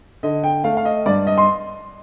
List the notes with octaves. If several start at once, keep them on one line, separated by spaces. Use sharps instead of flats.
D3 D#5
G5
A3 F5
F5
D#5
G2 D5
D#5
C6